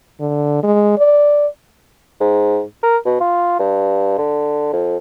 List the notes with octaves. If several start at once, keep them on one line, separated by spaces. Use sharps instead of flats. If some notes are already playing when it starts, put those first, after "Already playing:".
D3
G#3
D5
G#2
A#4
B2
F4
G2
D3
F2